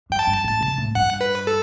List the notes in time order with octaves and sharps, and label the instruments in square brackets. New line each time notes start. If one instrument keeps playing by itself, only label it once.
[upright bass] G2 [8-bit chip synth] G5
[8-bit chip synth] A5
[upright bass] G2
A2
C3
A2
[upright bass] G2 [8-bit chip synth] F#5
[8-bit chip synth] B4
A4